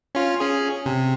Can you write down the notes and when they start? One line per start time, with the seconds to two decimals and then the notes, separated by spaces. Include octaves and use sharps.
0.15 C#4 F4
0.40 C#4 G#4
0.86 C3